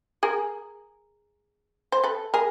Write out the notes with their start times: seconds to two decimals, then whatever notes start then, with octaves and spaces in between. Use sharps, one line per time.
0.23 G#4 A#4
1.92 C5
2.03 A4 B4
2.34 G#4 A#4